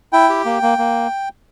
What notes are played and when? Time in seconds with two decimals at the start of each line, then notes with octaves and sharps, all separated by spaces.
0.13 E4 G5
0.29 G4
0.45 A#3
0.62 A#3
0.78 A#3